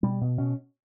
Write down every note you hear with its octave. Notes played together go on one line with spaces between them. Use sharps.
B2 G3
B2
B2 C#4